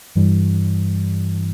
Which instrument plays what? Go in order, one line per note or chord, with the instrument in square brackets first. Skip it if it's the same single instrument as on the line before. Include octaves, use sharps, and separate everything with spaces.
[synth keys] G2 E3 G3